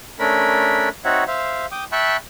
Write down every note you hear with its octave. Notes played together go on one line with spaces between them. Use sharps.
A3 C#4 D4 A#4 B5
C4 D#4 F#4 C#5 E5 F#5
C5 E5 F5
G5 D6 D#6
E5 G5 A5 B5 C#6 F#6